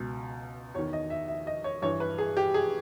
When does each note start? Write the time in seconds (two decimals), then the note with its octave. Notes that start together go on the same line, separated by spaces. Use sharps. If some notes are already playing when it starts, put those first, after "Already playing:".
Already playing: C#2 B2
0.74 E2 D#3 C#5
0.93 D#5
1.10 E5
1.28 E5
1.47 D#5
1.64 C#5
1.82 G2 E3 C#5
2.00 B4
2.18 G#4
2.37 G4
2.54 G#4